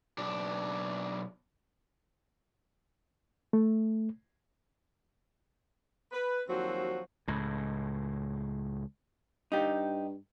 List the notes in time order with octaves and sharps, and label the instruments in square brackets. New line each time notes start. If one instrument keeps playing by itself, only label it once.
[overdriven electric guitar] B1 D4
[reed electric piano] A3
[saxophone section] B4
D#2 F3 F#3 C4 F#4 C5
[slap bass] C#2 A2
[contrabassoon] G2 [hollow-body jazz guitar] D#4 G4